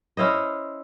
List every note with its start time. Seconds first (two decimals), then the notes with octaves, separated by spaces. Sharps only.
0.17 C#4 E4 C5 D#5